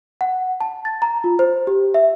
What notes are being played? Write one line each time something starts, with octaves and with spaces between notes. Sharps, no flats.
F#5
A5
A6
A#5
F4
C5
G4
E5